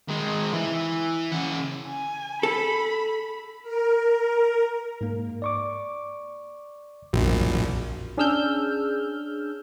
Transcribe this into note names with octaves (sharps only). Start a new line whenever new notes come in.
D#3 G#3
E3
C#3 F#5
G#5
A4 B5
A#4
G#2 A#3
D5 C#6 D6
A#1 F2 F4 F#4
C#4 D4 G#4 E6 F6 G6